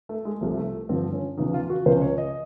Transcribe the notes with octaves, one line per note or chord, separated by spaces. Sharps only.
A3
G#3
C2 C3 F3 A3
A3
G2 D3 F3 C4
C#4
E2 C#3 F3 D#4
F4
F#4
C#2 C#3 F3 C5
C#5
D#5